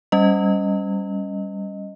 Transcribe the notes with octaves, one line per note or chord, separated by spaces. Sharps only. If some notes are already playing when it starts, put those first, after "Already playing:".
G3 C#4 D#5